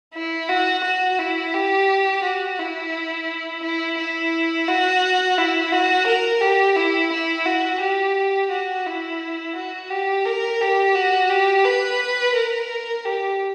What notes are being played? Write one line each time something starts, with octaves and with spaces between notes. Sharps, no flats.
E4
F#4
F#4
E4
G4
F#4
E4
E4
E4
F#4
E4
F#4
A#4
G4
E4
E4
F#4
G4
F#4
E4
F#4
G4
A#4
G4
F#4
G4
B4
A#4
G4